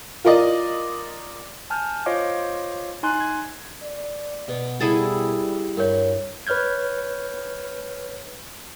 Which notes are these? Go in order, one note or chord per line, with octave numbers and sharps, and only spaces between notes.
F4 A#4 D5 D#5
G#5 A5 F6 G6
F4 C5 C#5 D#5 F5 D6
D#4 G#5 C6 F#6
G#6
D5
B2
G3 E4 G#4 A4
G2 A#4 C#5
B4 C#5 F6 G6 G#6